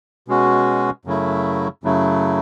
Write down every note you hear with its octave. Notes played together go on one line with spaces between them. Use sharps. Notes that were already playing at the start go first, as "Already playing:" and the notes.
B2 G#3 C#4 F#4
F#2 C#3 F#3 A3 E4
F#2 C#3 F#3 A3 E4